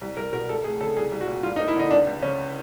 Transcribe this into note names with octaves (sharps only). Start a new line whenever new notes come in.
C2
C2 A#4
B2 A#4
C#2 A4
A3 G#4
C#3 A4
C2 G#4
C2
F#4
A#2
G2 F4
D#4
A#3
E4
D3 D#4
C#2 D4
C#2
C#3 C#4